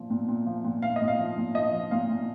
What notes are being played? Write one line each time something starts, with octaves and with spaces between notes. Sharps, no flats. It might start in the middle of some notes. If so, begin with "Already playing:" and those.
Already playing: A#2 F3
A#2
A#2
F3
A#2
A#2 F5
D#5
A#2
F5
F3
A#2
F3 D#5
F3
A#2 F5
A#2